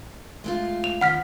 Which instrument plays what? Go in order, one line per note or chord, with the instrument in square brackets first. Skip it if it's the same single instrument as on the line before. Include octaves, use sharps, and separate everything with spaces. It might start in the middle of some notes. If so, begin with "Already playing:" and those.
[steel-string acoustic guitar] G#3 A3 F4
[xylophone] F7
[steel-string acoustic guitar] D#3 F3 [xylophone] F#5 F6 B6